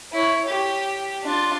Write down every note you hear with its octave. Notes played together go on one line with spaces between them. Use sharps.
E4 C#5
G4
D4 F4